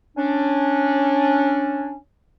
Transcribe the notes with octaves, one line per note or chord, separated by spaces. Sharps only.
C#4 D4